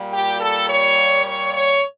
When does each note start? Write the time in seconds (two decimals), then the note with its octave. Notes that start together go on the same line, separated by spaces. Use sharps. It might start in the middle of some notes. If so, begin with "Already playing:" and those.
Already playing: A#2 G3
0.12 G4
0.39 A4
0.68 C#5
1.24 C#5
1.53 C#5